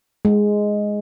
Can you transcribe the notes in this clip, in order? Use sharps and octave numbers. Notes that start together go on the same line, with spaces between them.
G#3